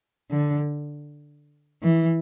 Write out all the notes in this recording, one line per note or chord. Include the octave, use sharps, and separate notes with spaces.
D3
E3